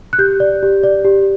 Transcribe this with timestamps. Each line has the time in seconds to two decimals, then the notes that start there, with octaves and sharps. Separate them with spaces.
0.13 F#6
0.19 G4 G6
0.40 D5
0.63 G4
0.83 D5
1.05 G4